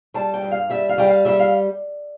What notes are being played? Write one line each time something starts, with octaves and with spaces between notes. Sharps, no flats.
G3 A5
G5
G2
F5
G3 E5
F5
G3 G5
F5
G3 E5
F5